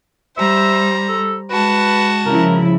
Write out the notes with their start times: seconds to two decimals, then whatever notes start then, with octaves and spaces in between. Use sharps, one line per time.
0.37 G3 C5 E5 A#5
1.08 A4
1.50 G#3 F#4 B4 A5
2.26 C#3 F3 E4 A#4